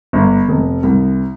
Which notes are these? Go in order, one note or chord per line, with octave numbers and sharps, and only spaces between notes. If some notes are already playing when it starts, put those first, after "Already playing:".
G1
F1
C2